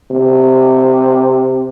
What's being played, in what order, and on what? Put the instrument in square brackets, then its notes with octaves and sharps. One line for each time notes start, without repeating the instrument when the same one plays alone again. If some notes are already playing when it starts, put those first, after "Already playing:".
[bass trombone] C3